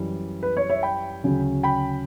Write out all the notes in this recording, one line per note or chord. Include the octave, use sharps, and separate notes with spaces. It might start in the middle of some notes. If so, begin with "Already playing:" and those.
Already playing: F#2 E3 G3
B4
C#5
C#5 E5
G5 B5
D2 C#3 F#3 C#4
G5 B5